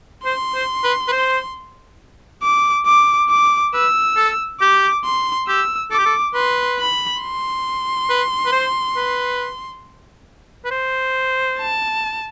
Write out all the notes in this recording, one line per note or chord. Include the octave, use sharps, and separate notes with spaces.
C5 C6
C5
B4
B4
C5
D6
D6
D6
B4 E6
A4
G4 D6
C6
G4 E6
A4 D6
G4
A4
B4 C6
B5
C6
B4
B4
C5
B4
B4
C5
A5